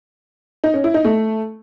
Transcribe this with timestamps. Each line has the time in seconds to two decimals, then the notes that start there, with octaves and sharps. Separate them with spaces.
0.64 D#4
0.74 C#4
0.84 E4
0.94 D#4
1.05 A3